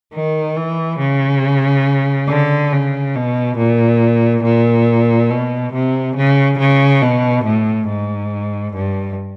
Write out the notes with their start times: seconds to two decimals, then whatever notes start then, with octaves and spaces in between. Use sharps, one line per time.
0.14 D#3
0.56 E3
1.00 C#3
2.29 D3
2.73 C#3
3.15 B2
3.58 A#2
4.44 A#2
5.30 B2
5.74 C3
6.17 C#3
6.59 C#3
7.02 B2
7.45 A2
7.89 G#2
8.75 G2